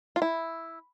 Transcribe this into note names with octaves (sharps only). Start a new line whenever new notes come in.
F4
E4